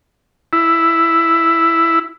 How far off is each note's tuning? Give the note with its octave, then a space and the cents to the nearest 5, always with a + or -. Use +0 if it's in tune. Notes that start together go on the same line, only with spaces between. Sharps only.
E4 +5